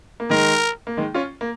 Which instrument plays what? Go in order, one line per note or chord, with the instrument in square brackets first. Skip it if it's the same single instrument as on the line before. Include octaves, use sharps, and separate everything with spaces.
[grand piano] A#3
[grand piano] D#3 G#3 [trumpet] A#4
[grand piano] A#3
D#3 G#3
C#4 F4
A#3